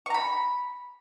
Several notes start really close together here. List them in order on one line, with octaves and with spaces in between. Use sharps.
C#6 A#5 B5